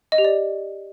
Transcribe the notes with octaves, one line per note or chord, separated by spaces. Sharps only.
D#5
G4
D5